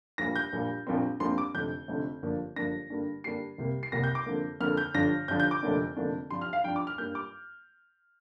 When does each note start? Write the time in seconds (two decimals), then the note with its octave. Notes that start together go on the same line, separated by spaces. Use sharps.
0.18 A#1 A#2 G3 A#6
0.36 G6
0.53 A#1 A#2 G3
0.87 A#1 A#2 G3 C4
1.20 A#1 A#2 G3 C4 C6
1.38 D6
1.54 F1 F2 D3 G6
1.88 F1 F2 D3
2.22 G1 G2 F3 A#3 D4
2.56 G1 G2 F3 A#3 D4 A#6
2.90 G2 D3 G3 A#3 D4
3.24 G2 D3 G3 A#3 D4 C7
3.58 C2 C3 G3 A#3
3.83 C7
3.92 C2 C3 G3 A#3 A#6
4.04 G6
4.15 D6
4.26 F2 D3 A#3
4.60 F2 D3 A#3 F6
4.77 G6
4.94 G1 G2 D3 F3 D4 A#6
5.28 G1 G2 D3 F3 D4 G6
5.40 G6
5.51 D6
5.63 F1 F2 D3 A#3 D4
5.97 F1 F2 D3 A#3 D4
6.30 G2 F3 D4 C6
6.41 F6
6.53 F5
6.64 G2 F3 D4 G5
6.76 D6
6.87 F6
6.98 G2 G3 A#3 G6
7.15 D6